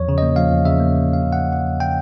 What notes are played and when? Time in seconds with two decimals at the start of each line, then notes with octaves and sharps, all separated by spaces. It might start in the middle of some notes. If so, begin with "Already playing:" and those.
Already playing: E2 F3 C#5
0.09 C#3
0.18 A#3 D#5
0.36 F3 F5
0.51 E2
0.65 C#3 E5
0.80 A#3
0.95 F3
1.09 E2 F5
1.23 C#3
1.33 A#3 F#5
1.52 F3 F#5
1.66 E2
1.80 C#3 G5